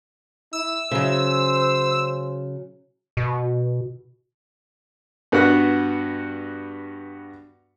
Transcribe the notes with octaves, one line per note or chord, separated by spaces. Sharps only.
E4 E6
C#3 F#3 C5
B2
G2 B3 F#4 F#5 F#6